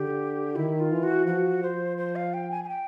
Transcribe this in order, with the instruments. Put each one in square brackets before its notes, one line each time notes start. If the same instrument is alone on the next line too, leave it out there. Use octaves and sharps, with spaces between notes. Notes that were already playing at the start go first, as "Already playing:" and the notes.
Already playing: [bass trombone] D3 [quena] G4
[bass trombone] D#3 [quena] E4
[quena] F4
[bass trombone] E3
[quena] F#4
[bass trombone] F3 [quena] F#4
[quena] C5
C5
F5
G5
G#5
G#5
G5